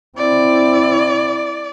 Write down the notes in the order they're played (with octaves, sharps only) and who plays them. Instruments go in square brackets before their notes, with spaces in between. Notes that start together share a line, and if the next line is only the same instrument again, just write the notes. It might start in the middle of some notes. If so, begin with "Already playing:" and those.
[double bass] C4 E4 [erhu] D5